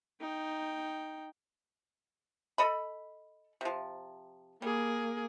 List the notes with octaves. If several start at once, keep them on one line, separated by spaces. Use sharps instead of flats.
D#4 G5
A4 D#5 B5
C3 F3
G3 A#3 G#4